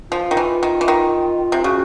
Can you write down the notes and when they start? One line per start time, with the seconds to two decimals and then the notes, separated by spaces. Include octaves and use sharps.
0.11 F3 F4
0.31 D#3
0.37 E3
0.63 D#3
0.81 E3
0.88 D#3
1.52 C3
1.64 C#3 F#4